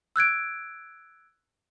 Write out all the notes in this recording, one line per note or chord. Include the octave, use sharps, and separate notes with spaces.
E6 F#6 G#6 D7